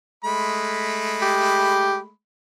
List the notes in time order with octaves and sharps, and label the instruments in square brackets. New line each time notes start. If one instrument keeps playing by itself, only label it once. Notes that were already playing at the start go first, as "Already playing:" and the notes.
[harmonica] G#3 A3 B5
[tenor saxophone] G4